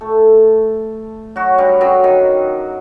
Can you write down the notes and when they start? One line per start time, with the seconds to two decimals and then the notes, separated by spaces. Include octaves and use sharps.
0.01 A3 A4
1.36 F#3 F#4
1.58 G2 G3
1.81 F#2 F#3
2.04 D#3